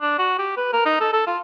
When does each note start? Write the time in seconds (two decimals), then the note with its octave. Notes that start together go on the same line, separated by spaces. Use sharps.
0.01 D4
0.19 F#4
0.39 G4
0.57 B4
0.73 A#4
0.86 D#4
1.01 A4
1.13 A4
1.27 F4